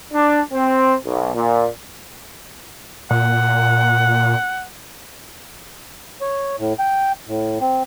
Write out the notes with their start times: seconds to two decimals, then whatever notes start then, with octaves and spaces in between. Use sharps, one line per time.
0.12 D4
0.52 C4
1.03 B1
1.35 A#2
3.11 A#2 F#5
6.21 C#5
6.59 A2
6.79 G5
7.28 A2
7.61 C4